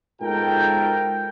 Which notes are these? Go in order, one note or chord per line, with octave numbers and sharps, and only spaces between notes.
G#2 B2 F4 A4 A#4 G5